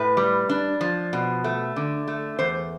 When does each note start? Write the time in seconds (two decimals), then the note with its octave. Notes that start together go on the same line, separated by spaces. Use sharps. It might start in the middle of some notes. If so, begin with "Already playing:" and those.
Already playing: A2 B4
0.17 G3
0.49 D4
0.81 F3
1.13 B2
1.44 A3
1.76 D3
2.08 A3
2.39 E2 C5